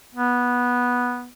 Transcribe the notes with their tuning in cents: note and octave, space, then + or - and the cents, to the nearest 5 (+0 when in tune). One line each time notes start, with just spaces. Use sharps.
B3 -10